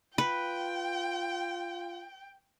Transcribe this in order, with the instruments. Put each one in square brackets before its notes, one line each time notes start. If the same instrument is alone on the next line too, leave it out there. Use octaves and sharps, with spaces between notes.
[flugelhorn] F4 [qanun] B4 [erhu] G5